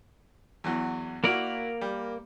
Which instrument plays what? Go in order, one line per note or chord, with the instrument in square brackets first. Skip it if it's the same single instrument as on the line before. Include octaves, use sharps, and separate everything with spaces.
[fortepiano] E2 E3 F#3
[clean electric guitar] A#3 A#4 D5 [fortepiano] E4 F#4
[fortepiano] G3